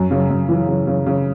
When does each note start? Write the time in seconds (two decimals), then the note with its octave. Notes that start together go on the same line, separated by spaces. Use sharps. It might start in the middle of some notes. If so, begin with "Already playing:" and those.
Already playing: F#2 F#3
0.11 C#3
0.30 F#2
0.49 E3
0.68 C#3
0.87 C#3
1.06 C#3